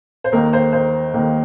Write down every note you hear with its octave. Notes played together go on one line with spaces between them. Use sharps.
C5
D#2 D#3 A#3 A#4
C5
C5
D#2 D#3 A#3